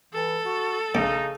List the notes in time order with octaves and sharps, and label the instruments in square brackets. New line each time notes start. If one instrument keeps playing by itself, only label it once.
[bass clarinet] E3 [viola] A4
[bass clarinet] F#4
[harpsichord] A#1 [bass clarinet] C#3 [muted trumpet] D#4